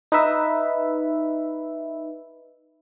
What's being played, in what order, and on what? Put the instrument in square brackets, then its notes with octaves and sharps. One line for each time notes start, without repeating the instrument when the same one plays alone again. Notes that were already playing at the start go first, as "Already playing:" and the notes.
[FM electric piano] D#4 B4 E5